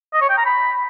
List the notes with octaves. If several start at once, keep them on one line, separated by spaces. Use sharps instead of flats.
D#5
C#5
G5
A#5
B5